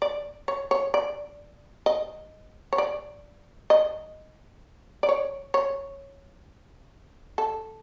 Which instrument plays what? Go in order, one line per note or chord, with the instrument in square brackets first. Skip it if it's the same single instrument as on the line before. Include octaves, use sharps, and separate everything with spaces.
[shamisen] D5
C#5
C#5
D5
D#5
C#5
D5
D#5
D5
C#5
C#5
A4